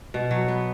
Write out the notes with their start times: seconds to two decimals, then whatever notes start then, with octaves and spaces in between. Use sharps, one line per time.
0.14 B2
0.31 F#3
0.48 B3